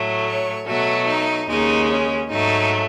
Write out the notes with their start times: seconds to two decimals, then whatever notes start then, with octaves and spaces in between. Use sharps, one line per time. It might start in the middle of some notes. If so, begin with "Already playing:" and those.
Already playing: A2 F#3 A3
0.27 C#5
0.67 B2 F#3 A3 F#4
1.08 D#4
1.48 D#2 C#3 G#3 D#4
1.90 C#4
2.30 G#2 F#3 A3 D#4